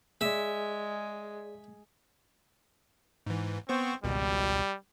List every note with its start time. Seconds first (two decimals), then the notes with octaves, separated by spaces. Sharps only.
0.21 G#3 G#4 D5 E5
3.27 G#2 E3
3.69 B3 C4 C5 C#6
4.04 G#1 C#2 B2 G3